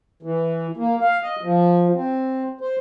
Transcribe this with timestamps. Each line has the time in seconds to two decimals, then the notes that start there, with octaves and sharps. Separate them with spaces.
0.23 E3
0.77 A#3
1.01 F5
1.23 D#5
1.43 F3
1.94 C4
2.61 C5